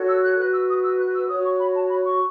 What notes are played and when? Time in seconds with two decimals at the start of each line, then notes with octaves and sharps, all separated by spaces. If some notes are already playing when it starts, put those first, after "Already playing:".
Already playing: F#4 A4 C#5
0.08 E6
0.24 F#6
0.38 F#4 B4 F#6
0.53 E6
0.69 D#6
0.84 E6
0.99 F#6
1.14 E6
1.29 C#5 D#6
1.33 F#4
1.44 C#6
1.60 B5
1.74 A5
1.89 B5
2.04 C#6